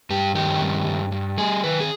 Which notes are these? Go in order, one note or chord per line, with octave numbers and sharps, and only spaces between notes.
G2 G4
D#3 G4
G2
G2
G2
G3 G#4
D#3 B4
G#4